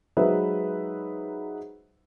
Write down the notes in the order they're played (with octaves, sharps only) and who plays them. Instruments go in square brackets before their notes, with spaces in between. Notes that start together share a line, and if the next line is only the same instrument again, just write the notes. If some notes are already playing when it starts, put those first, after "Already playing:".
[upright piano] F#3 G#3 D#4 B4 C5 E5